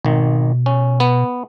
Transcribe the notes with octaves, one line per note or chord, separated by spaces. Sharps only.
G#1 B2 D#3
C#4
B3